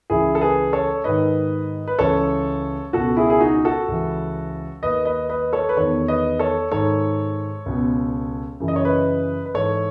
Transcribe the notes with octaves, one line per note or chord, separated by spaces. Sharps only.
C#2 C#3 E3 E4 G#4
A4
G#4 B4
A4 C#5
G#2 D#3 B4 D#5
B4
C#2 C#3 E3 A4 C#5
C#2 B2 F#4 A4
E4 G#4
G#4
D#4 F#4
F#4 A4
C#2 C#3 E3
D#2 D#3 B4 D#5
B4 D#5
B4 D#5
A4 C#5
B4
E2 D#3 A4 C#5
B4 D#5
A4 C#5
G#2 D#3 A4 C#5
C#2 B2
F#2 C#3 E3
D#5
C#5
B4 D#5
B4
G#2 E3 A4 C#5